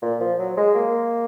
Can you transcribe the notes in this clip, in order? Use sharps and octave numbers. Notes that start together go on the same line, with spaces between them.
A#2
F3
F#3
G#3
A#3